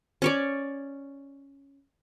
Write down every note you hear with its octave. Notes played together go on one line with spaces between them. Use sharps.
C#4 C#5 D5